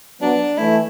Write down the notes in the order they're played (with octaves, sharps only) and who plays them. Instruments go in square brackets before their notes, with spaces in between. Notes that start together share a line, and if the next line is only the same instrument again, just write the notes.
[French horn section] F#3 B3 [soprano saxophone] D4
[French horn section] E3 A3 [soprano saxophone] E4